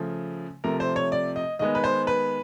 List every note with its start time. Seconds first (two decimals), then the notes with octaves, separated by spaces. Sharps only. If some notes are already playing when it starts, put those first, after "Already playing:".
Already playing: C#3 F3 A3
0.64 C3 F3 A3 A#4
0.80 C5
0.96 C#5
1.12 D5
1.36 D#5
1.59 D#3 G#3 B3 D#5
1.75 B4
1.84 C5
2.07 B4